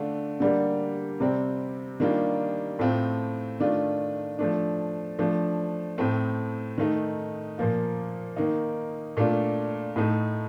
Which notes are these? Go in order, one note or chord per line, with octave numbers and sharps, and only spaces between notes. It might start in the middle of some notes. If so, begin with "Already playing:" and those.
Already playing: D3 A3 D4 F4
D3 G3 A#3
C3 G3 C4
D#3 G3 A#3 D4 F4
A2 A3 C4 F4
D#3 A3 D4 F4
F3 A3 D4
F3 A3 D4
A2 A3 C4
D#3 A3 D#4
A#2 F3 A#3 F4
D#3 A#3 D#4
A#2 A3 D4 F4
A2 A3 D#4